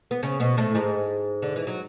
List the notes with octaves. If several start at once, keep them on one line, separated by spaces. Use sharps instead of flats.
B3
C#3 C#4
B2 B3
A2 A3
G#2 G#3
D3
E3
F#3